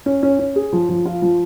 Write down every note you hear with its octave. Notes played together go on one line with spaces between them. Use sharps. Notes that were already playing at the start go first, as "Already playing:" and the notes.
C#4
C#4
C#4
G#4
F3
F3
F4
F3